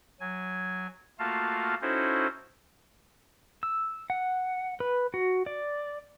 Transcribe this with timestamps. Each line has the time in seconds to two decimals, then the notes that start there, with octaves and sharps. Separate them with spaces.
0.20 F#3 G#5
1.19 A3 A#3 F4 F#4 F5 A5
1.81 C#4 D#4 E4 F#4 A4 C5
3.63 E6
4.10 F#5
4.80 B4
5.14 F#4
5.46 D5